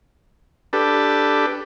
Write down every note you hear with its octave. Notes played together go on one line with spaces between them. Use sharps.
D4 G4 A4 B4